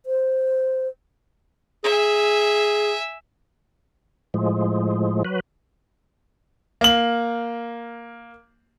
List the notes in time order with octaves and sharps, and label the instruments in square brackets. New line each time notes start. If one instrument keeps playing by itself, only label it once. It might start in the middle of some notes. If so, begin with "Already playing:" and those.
[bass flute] C5
[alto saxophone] G#4 [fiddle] E5 G#5
[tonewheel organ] A2 F3 G#3
F#3 B4
[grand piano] A#3 F#7